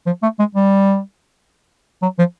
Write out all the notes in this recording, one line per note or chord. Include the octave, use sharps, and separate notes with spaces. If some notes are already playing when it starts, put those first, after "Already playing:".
F3
A3
G#3
G3
F#3
F3